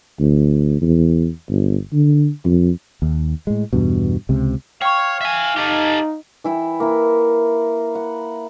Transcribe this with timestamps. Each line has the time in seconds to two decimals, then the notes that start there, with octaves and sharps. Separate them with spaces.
0.19 D2
0.82 E2
1.49 G1
1.93 D3
2.45 F2
3.02 D#2
3.47 A2 G#3
3.73 E2 G2 B2
4.29 C#2 C3
4.82 C#5 F5 G5 C#6
5.21 E5 G#5
5.57 D#4 G4 A4
6.44 E3 E4 G5
6.80 A#3 E4
7.95 F#5